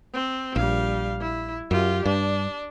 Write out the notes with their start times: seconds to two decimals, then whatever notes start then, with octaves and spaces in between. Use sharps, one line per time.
0.14 C4
0.56 A#1 G3 F5
1.20 E4
1.71 F#2 F4 G4
2.06 G2 D4